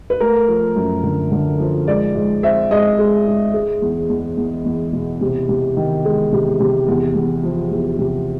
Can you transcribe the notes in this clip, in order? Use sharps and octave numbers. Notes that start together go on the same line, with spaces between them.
B4
A3 A#4
F3
F#2
D3
D3
F3
G#2 D5
G#2
C4 E5
G#2 D#5
G#3
G#2
G#3
E2
E2
E2
E2
B2
C3
C3
D#3
G#3
C3
C3
E2
E2
F3
E2
C3